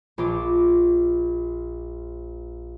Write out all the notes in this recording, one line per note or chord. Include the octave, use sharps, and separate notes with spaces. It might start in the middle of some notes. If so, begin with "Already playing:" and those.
A#1 F4 D6